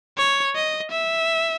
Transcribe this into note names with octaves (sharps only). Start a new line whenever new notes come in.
C#5
D#5
E5